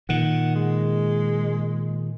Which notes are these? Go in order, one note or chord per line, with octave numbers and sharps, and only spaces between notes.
A#2 D#3 F#5
G#3